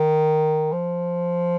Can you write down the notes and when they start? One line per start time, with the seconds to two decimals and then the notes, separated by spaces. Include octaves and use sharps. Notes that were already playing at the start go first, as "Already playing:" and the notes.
Already playing: D#3
0.72 F3